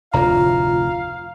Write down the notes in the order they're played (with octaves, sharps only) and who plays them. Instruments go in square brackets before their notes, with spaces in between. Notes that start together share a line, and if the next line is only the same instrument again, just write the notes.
[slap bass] F1 D2 A2 [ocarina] F4 [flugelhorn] F5 [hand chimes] A#5